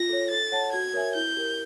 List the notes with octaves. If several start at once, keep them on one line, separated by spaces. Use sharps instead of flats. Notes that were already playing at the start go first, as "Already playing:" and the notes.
Already playing: F4 A#6
A4 C#5
A4 A6
C#5 F#5 A5
F#4 G#6
A#4 C#5 E5 G#5
E4 G6
G4 A#4